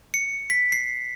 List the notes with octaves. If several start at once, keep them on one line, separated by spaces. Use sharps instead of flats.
C#7
B6
C7